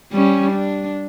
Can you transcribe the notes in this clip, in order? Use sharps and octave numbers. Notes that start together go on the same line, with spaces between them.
G3 C#4
D4